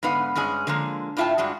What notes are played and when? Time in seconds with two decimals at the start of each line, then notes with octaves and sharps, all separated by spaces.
0.03 G#2 D3 B3 B4 F5
0.35 G2 G#3 C#4 G#4
0.67 D3 F3 G#3 A#3
1.17 A2 D4 F4 E5 G5 A5
1.38 G2 G#3 D4 F#4